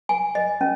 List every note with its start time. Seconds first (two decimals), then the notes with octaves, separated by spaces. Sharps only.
0.09 G#5
0.35 D#5
0.61 C#4